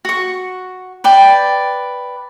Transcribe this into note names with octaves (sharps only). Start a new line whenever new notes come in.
F#4 C#6
B4 D5 G5